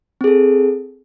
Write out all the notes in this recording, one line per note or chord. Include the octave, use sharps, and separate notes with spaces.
C4 G#4 A4